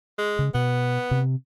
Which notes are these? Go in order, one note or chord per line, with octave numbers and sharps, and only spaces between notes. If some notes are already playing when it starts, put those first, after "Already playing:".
G#3
C#3
B2 B3
C3